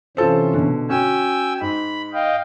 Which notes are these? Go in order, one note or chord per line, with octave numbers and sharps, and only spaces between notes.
C3 E3 C#4 F4 A4 C5
B2 D3
C#4 F#4 G5 G#5 E6
G#2 B5
D#5 F5 G5